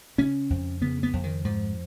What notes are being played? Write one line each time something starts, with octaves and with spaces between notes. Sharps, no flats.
C#3 C#4
F2
C#3 B3
B3
F2
D#3
G#2 F3